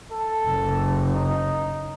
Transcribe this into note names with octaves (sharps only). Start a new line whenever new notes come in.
A4
F#1
D#4